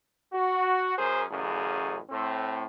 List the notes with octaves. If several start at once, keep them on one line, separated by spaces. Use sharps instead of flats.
F#4
F#2 G#4 A#4 C5
A1 F#2 C#3 G#4
A2 C4